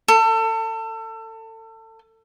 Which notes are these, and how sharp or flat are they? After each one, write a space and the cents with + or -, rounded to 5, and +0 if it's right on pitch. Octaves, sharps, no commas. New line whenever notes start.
A4 +30